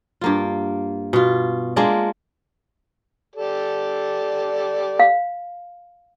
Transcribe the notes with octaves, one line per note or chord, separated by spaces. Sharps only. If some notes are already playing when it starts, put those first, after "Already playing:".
G2 A#3 F4
B2 F4
G#3 A#3 D4 F4
G4 A4 D5
F5